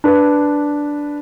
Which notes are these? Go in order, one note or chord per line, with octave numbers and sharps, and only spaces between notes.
D4 B4